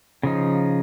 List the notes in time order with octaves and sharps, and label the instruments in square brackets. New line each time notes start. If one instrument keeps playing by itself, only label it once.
[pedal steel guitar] C#3 F3 D#4